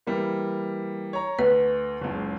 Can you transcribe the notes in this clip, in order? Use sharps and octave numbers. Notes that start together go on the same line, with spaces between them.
E3 G3 A#3
C#5 A#5
D2 B4
F#1 C#2